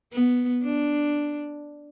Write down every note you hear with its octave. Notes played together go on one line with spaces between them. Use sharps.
B3
D4